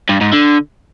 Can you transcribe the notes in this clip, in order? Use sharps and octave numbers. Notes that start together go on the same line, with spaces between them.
G2
G#2
D3